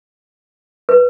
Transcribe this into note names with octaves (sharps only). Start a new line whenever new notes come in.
B4